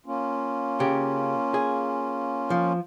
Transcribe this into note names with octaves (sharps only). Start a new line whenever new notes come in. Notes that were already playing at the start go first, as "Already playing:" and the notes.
A#3 C#4 F4
C#3 G4
G#4
F3